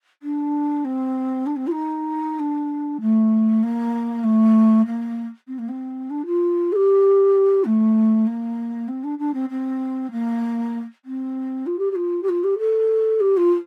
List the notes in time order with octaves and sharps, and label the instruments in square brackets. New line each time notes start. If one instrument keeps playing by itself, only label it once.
[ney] D4
C4
D4
C4
F4
D#4
D4
A3
A#3
A3
A#3
C4
A#3
C4
D4
F4
A4
G4
A3
A#3
C4
D4
D4
C4
C4
A#3
C4
F4
G4
G4
F4
G4
F4
G4
A4
G4
F4